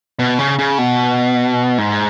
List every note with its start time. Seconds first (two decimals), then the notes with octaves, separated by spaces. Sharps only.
0.19 B2
0.39 C#3
0.59 C#3
0.78 B2
1.78 G#2